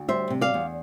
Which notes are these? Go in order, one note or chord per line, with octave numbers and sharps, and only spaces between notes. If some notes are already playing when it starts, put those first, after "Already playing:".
Already playing: D2
G3 C5 E5
C3
D5 F5
E2